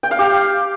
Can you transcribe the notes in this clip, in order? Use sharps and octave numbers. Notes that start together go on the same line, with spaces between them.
G5
F5
G4